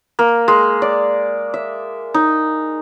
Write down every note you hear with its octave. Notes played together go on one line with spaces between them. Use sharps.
A#3
G#3
D5
E5
D#4